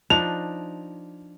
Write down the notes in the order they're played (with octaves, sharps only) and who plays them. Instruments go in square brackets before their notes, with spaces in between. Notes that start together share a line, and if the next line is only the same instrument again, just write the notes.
[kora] F3 D4 D#4 [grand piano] F7